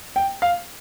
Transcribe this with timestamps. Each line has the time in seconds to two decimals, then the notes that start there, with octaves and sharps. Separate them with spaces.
0.16 G5
0.42 F5